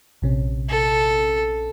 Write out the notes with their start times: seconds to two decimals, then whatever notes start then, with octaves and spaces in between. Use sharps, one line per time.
0.22 A#1 C3 C#4
0.70 A4